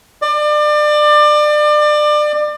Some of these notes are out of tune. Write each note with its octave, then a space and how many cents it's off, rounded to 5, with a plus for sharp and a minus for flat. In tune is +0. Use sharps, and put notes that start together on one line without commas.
D5 +30